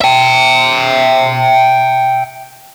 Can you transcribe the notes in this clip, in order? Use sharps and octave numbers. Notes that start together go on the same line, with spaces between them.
E5 G5